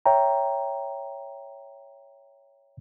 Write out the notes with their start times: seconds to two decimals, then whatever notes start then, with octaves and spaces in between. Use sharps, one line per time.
0.06 C#5 E5 G5 A#5